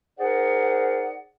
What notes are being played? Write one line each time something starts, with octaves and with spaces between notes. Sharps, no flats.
D#4 G#4 A#4 C5 D5 F#5